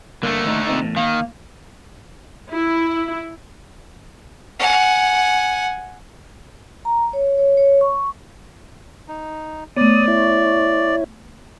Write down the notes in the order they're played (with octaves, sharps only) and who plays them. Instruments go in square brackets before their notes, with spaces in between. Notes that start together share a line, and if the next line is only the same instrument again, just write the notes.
[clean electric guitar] G2 A#3 [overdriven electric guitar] D3 A3
[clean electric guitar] D#2 A2 D#4
A#2 C4 D#4
E2 A2
[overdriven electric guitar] D#3 [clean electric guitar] A#3 F5
[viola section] E4
[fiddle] F#5 G#5
[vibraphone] A#5
C#5
C#5
C#5
C#6
[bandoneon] D#4
[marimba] A3 B3 [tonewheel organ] C#5 D#6 [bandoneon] D5
[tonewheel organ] E4 C#5